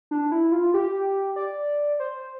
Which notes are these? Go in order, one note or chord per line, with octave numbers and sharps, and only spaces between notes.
D4
E4
F4
G4
D5
C5